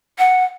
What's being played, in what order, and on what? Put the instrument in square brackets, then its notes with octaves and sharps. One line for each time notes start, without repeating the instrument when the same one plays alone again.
[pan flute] F#5